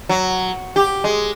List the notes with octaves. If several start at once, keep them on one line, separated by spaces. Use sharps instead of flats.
F#3
G4
G#3